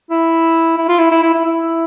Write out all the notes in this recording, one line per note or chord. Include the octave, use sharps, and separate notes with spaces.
E4
E4
F4
E4
E4
E4
E4
E4